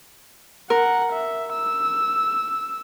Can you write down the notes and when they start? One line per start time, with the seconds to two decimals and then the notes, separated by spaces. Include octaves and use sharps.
0.70 A#4 F#5
1.12 E5
1.52 E6